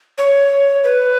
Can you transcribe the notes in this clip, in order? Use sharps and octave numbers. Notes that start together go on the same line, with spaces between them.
C#5
B4